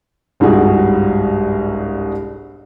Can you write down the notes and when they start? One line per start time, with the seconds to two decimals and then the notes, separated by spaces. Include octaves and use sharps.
0.40 G1 C2 G#2 F#4 G#4